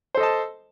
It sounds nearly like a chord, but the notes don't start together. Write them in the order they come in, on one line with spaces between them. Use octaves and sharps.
C5 A4 D#5 A5